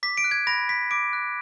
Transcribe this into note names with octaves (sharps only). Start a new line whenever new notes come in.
D6 B6
D7
F#6
G#6
B5 A#6
B5 B6
D6 D7
F#6